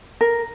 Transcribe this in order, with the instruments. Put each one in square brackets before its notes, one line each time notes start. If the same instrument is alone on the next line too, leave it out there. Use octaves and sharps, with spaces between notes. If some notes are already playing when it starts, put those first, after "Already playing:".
[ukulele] A#4